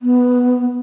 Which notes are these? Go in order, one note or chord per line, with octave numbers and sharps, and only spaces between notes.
B3